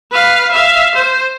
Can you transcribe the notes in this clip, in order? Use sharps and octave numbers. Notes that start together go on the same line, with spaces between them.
B4 F5
E5 F5
C5